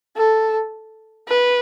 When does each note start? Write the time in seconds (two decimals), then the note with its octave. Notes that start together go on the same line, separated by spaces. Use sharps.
0.17 A4
1.28 B4